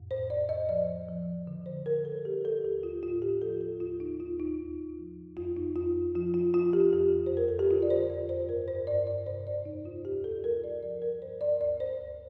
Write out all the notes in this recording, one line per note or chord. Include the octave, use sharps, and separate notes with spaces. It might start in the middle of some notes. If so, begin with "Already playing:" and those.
Already playing: F2 A2
C5
F2 D5
D#5
F3 D5
F3
D3
C5
D3 A#4
A4
G3 G4
A4
D#2 G4
F4
A2 F4
G4
F3 A4
A4
D#2 F4
D#4
D#2 F4
D#4
D2
F3
F2 F4
D#4
F2 F4
F3 F4
F4
F3 F4
G4
F2 G4
C5
F2
A#4
A4
G4
D3 F4
D5
C5
F2 D5
C5
G2 A#4
C5
G2 D5
D5
C3 C5
D5
F2 D#4
F4
D#2 G4
A4
G3 A#4
D5
F3 D5
A#4
G2 C5
D5
D2 D5
C5
D2